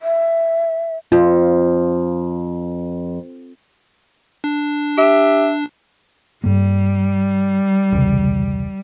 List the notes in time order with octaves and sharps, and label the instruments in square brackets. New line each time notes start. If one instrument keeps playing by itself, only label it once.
[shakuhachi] E5
[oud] F2 [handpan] F4
[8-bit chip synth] D4
[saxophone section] G4 E5
[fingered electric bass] G2 A#3 [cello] G3
[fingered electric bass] E1 C2 C#3